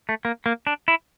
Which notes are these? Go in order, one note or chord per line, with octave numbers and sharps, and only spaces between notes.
A3
A#3
A#3
D4
E4